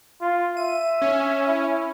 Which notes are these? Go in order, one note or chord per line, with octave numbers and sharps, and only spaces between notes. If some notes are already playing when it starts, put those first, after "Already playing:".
F4
E5 D#7
C#4
E4